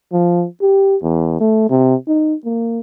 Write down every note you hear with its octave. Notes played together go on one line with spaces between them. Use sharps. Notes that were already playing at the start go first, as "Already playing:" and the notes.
F3
G4
E2
A3
C3
D#4
A#3